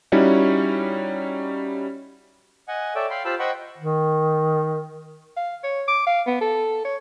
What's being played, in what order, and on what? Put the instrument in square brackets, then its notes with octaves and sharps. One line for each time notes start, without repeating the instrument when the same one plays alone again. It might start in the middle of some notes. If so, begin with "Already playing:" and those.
[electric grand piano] G3 C#4 D#4 E4 F#4
[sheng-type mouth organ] D#5 F#5 G#5
A4 C#5 D5 E5 G5
F5 G5 B5 C6
F4 G4 C5 A5 B5 E6
C5 D#5 F#5 G5 B5 C#6
[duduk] D#3
[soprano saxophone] F5
C#5
D6
F5
B3
A4
C#5